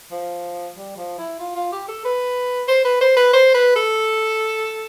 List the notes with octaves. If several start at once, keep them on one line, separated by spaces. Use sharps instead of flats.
F3
G3
F3
E4
F4
F4
G4
A4
B4
C5
B4
C5
B4
C5
B4
A4